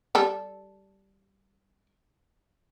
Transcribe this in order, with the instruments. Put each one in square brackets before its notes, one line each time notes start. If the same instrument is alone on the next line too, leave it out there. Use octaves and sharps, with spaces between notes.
[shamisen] G3 A4